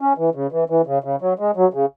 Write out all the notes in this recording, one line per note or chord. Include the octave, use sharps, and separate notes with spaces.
C#4
E3
C#3
E3
E3
C#3
C#3
F#3
G#3
F#3
C#3